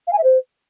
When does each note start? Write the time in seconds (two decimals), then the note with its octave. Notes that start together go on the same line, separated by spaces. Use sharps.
0.07 F5
0.12 G#5
0.18 E5
0.23 C5